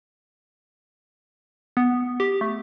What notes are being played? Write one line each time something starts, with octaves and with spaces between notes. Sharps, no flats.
B3
G4
A3